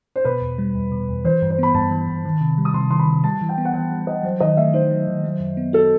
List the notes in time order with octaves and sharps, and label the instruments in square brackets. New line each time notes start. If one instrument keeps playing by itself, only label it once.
[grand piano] C5
[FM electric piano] B2 [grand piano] B4
[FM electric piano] E2
G3
E2
B2
E2
[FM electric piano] E3 [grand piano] C5
[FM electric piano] G2
[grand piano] C5
[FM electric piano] B3 [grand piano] B5
[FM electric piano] G2 [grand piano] A5
[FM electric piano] E3
G2
D#3
C3
G3
[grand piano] D#6
[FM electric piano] C3 [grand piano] C6
[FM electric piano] D#3 [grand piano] C6
[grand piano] B5
[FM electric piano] C3
[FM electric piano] G3 [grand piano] A5
[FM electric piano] E3
[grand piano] G5
[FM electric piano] B3
[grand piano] F#5
[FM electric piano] E3 [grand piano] G5
[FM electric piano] G3
[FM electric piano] E3 [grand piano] D#5
[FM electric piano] F#3 [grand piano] C5
[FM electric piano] D#3 [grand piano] D#5
[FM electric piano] A3 [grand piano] E5
[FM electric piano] D#4 [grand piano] C5
[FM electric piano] F#3
D#3
F#3
F#2
B3
[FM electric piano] F#4 [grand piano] A4